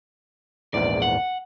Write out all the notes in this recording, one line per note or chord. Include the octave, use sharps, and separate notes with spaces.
A#1 E2 G#2 D5
F#5